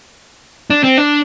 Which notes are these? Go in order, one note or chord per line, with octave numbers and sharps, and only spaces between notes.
D4
C4
D4